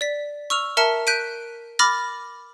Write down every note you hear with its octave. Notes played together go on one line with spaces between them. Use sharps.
D5 B6
C#6 E6 F6 F7
A#4 E5 A5 A#5 F6 C#7
F#6 G6 B6 D7 D#7
B5 D6 F6 A6 A#6